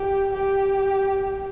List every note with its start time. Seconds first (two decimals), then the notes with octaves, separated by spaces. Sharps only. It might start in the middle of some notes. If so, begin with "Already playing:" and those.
Already playing: G4
0.33 G4